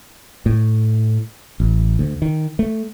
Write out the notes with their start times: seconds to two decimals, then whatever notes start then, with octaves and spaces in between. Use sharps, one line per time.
0.46 A2
1.60 A1
1.99 D2
2.22 D#3
2.59 A3